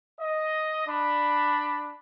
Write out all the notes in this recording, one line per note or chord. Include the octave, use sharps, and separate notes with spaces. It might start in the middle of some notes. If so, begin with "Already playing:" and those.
D#5
D4 B5